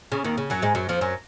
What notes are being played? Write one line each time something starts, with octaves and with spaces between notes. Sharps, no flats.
C#3
D#2 D#3
C#3
F#2 F#3
G#2 G#3
F#2 F#3
F2 F3
F#2 F#3